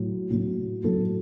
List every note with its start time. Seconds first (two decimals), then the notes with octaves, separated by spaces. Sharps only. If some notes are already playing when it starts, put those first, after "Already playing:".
Already playing: A2 F#3
0.31 A2 F#3
0.84 A2 F#3 A4